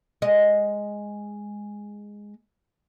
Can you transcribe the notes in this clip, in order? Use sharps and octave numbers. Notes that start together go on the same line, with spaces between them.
G#3 D#5